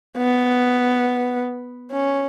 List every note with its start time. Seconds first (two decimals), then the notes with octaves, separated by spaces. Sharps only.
0.17 B3
1.92 C#4